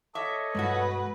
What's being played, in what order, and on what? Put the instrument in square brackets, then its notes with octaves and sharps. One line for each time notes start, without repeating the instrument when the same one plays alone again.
[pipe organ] A4 C#5 D#5 [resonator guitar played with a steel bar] E5 [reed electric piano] D6
[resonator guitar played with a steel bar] E2 B2 F#4 [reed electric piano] G2 G#3 [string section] B4